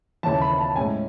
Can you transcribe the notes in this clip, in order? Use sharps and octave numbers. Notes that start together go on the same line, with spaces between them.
D#2 C#3 E3 A5
B5
A5
A2 G#3 C#4 G#5